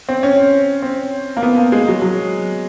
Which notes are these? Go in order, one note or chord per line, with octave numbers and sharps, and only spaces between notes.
C4
C#4
C4
A#3
B3
A#3
G#3
F#3
F#3